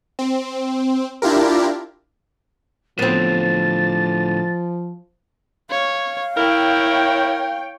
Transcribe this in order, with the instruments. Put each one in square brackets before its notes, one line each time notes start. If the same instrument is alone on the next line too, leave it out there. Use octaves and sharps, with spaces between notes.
[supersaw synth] C4
D4 E4 F4 G4 A#4
[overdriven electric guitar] A2 D3 [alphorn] F3 [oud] B3 C4 [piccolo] A6
[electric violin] C#5 [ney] F5
[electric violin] E4 [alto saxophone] A#4 [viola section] C#5 G5